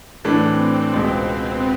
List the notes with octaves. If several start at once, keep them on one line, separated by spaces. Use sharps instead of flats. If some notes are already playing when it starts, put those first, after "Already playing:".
A2 E3 A3 C4 D4
C#2 B2 G#3 C4
B3